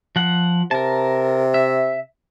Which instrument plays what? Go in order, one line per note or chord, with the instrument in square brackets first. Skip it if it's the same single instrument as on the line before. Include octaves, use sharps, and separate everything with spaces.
[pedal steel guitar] F3 F#5
[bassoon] C3 [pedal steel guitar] A#4 A5
[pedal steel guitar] E5